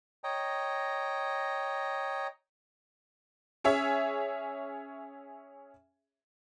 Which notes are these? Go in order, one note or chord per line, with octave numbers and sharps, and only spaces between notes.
C#5 D#5 G5 A#5
C#4 G#4 C#5 E5